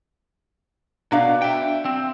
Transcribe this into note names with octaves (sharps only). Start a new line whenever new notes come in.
B2 D4 F#4 D5 F5
E5 G5
C4